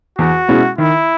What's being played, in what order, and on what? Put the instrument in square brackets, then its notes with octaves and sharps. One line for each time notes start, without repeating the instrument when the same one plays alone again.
[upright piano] E2 [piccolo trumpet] F#4
[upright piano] B2 G#3 C#4 E4
[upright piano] D#3 [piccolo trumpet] E4